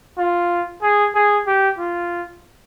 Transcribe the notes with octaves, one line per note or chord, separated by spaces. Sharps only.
F4
G#4
G#4
G4
F4